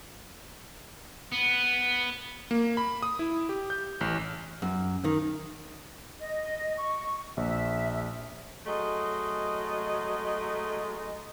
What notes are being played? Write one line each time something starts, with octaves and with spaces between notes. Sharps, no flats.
B3
A#3
B5
D#6
E4
G4
G6
A1
F#2
D#3
D#5
C#6
A#1 E5
F#3 G#3 A3 D#5